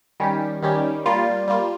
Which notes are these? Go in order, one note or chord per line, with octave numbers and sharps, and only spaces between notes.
D#3 G3 C#4 G4
D#3 G3 C#4 G4
G3 A#3 F4
G3 A#3 F4